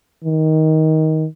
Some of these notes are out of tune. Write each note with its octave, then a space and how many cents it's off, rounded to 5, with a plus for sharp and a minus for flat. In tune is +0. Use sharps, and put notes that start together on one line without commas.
D#3 +15